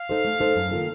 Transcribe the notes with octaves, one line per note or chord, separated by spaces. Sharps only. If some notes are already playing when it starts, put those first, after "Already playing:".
Already playing: F5
D#4 A4 C5
A3
D#4 A4 C5
F#2
D#3 A#3 F4 A4